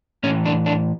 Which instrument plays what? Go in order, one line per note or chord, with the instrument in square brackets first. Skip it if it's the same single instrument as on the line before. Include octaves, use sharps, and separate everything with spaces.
[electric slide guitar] A2 C#4
E3
D4
D4